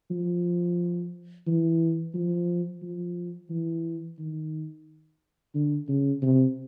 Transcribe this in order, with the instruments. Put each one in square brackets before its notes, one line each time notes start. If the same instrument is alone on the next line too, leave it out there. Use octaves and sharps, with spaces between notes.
[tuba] F3
E3
F3
F3
E3
D#3
D3
C#3
C3